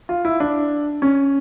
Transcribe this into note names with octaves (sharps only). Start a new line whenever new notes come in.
F4
E4
D4
C#4